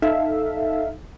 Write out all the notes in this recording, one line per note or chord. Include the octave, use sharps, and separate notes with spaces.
D#4 A4 E5 F5